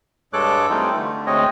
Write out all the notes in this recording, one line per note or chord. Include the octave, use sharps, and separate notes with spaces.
G2 G#3 A4 C#5 D6 F#6
E3 G3 A3 C4 D#4 F4
D3 A3
D2 G#3 C4 C#5 D#5